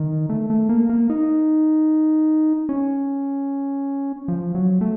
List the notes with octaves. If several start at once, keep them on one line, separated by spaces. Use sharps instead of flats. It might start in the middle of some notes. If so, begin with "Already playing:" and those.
Already playing: D#3
A3
A3
A#3
A#3
D#4
C#4
F3
F#3
A3